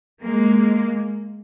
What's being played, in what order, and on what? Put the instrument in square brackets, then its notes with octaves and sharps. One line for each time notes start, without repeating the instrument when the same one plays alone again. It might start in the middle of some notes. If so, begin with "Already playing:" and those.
[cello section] G#3 A#3